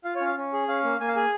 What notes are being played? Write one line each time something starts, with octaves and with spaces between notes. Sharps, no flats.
F4 F5
C#5
C#4
F5
C#4
G#4
C#4 F5
A#3
A#3 G#5
F5
G#4 G#5